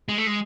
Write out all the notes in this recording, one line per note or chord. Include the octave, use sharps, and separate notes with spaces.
G#3
A3
G#3